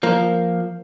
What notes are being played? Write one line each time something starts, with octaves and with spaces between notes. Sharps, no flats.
F3 A#3